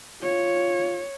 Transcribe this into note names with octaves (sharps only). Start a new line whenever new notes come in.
F4 C#5